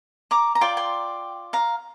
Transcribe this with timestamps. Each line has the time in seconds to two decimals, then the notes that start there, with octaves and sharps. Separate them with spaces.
0.31 A#5 D6
0.55 A#5
0.61 F4 D5 G5 C6
0.77 G5 C6
1.53 F5 A#5